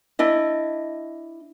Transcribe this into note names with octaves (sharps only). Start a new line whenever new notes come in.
D4 E4 D#5